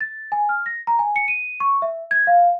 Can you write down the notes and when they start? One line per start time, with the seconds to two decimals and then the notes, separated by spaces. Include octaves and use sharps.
0.01 A6
0.32 G#5
0.49 F6
0.66 A#6
0.87 A#5
0.99 G#5
1.16 C#7
1.28 D#7
1.60 C#6
1.82 E5
2.11 G#6
2.27 F5